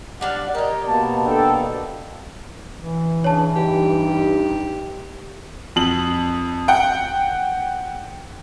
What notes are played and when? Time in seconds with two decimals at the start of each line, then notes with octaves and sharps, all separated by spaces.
0.21 G3 D4 F5 F#5
0.55 G4 A#4 C#5 D#5
0.87 B2 A#3 B3 A5
1.25 D4 A4 G5
2.78 E3
3.24 C#3 D4 C#5 A5
3.56 G2 D#4 G4
5.76 F2 F#7
6.68 F#5 G5